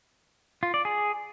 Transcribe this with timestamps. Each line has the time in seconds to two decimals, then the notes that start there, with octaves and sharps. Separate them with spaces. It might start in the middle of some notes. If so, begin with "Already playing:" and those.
0.63 F4
0.74 D5
0.85 G#4